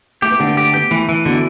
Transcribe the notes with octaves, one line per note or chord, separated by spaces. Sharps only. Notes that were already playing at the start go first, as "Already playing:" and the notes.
A3 G4
B3
D3 A3
B3
A3 G4
B3 G4
E3 A3
E3
B2 D3